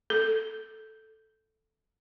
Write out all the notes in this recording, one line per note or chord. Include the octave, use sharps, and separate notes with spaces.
A4